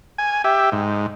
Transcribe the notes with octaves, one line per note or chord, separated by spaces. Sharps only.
G#5
G4 E5
G#2